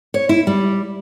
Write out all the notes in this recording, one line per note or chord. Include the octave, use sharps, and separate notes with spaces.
C#5
E4
G3